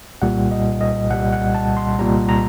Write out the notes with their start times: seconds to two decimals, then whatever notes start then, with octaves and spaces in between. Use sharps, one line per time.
0.22 C2 A#2 G3 F#5
0.52 D#5
0.81 D#5
1.10 C2 A#2 G3 F#5
1.33 F#5
1.54 A5
1.77 C6
1.99 C2 A#2 G3 A#5
2.29 A#5